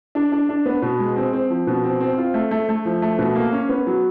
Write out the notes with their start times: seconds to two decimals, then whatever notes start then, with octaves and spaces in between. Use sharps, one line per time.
0.15 D4
0.32 D4
0.49 D4
0.66 B3
0.82 B2
0.99 G#3
1.16 C4
1.33 C4
1.50 F3
1.67 B2
1.84 C4
2.00 C4
2.18 F4
2.34 A3
2.51 A3
2.69 A3
2.85 F3
3.02 A3
3.19 B2
3.35 A#3
3.52 C#4
3.69 B3
3.87 F#3